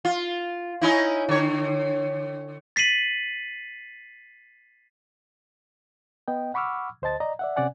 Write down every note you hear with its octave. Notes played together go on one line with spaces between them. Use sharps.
F4
C#4 D#4 E4
D3 C#5
A6 B6 C7 D#7 F#7
B3 D#5 G5
F#5 B5 C#6 D6 E6 F6
D2 C5 D#5 A5 A6
D5 D#5 A#5
D5 E5 F#5
C3 C#4 D5 F#5 G#5